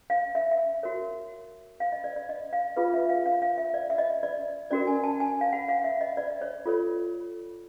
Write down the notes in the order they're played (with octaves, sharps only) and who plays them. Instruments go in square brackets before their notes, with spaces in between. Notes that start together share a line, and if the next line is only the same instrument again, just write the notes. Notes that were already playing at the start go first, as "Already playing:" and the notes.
[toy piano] F5
E5
E5
F#4 A#4 C#5
F5
D#5
D5
D5
D#5
F5
F4 G#4 B4 F5
E5
F5
F5
F5
E5
D5
E5
D#5
D5
C#4 F#4 A#4 D5
G#5
A5
G#5
F5
F#5
F5
E5
D#5
D5
C#5
F4 A4 C#5